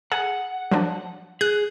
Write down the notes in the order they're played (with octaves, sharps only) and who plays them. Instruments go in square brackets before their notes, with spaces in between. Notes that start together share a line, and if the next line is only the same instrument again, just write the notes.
[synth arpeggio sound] G#4 [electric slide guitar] F#5
[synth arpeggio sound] F3 F#3 D4
[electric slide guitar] G#4 [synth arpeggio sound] F#6